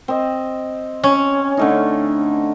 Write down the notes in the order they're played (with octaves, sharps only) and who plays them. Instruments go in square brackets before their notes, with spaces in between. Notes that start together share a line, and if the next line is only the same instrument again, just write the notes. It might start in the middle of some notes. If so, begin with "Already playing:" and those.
[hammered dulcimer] C4 D#5
[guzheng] C#4
[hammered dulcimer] D3 A3 D#4